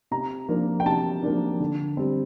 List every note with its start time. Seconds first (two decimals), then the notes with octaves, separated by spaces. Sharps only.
0.11 C3 A#5
0.48 F3 A#3 D4
0.80 G5
0.86 C3 A5
1.23 F3 A#3 D4
1.60 D3
1.97 G3 C4